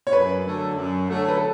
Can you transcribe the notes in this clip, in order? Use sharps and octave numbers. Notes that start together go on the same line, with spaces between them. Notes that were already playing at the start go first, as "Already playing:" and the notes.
C#5
F#2 B4
D3 F#3 A3
F#2
D3 F#3 A3
B4
A4